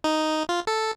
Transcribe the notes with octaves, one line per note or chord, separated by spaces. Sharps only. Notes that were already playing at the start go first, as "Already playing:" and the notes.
D#4
F4
A4